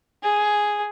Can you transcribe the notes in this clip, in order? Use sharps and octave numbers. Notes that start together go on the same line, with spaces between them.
G#4